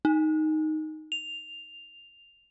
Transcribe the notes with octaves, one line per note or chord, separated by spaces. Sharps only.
D#4
F7